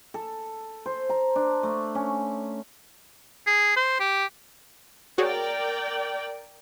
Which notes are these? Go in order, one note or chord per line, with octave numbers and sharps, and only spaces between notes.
A4
C5
A#5
D4
A3
C#4
G#4
C5
G4
F#4 G#4 A#4 C#5 D5 G5